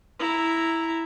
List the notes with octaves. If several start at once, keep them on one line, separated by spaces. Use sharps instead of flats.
E4 A#5